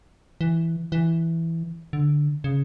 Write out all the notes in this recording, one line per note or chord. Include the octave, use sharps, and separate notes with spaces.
E3
E3
D3
C#3